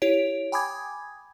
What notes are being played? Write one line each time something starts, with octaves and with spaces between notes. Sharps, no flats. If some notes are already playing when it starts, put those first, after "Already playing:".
E4 G4 C#5 D7
G5 G#5 B5 D6 D#6 G#6